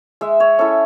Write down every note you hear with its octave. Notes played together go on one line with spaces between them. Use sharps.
G#3 E5
C#5
C#4 E4 A4